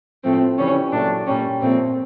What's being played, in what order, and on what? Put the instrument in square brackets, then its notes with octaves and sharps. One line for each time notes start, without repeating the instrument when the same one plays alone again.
[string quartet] A2 F3 A3 C4
C#3 E3 G3 C#4
A#2 F#3 A3 D4
A#2 G3 C#4
A#2 F3 A3 C4